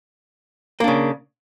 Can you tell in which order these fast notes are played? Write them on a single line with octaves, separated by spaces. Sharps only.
A#3 D4 C#3